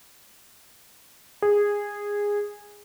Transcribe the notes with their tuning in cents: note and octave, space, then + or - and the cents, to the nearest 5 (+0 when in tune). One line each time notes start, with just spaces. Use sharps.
G#4 -15